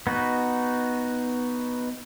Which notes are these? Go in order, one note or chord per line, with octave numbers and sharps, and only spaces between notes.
B3 D#4 F#4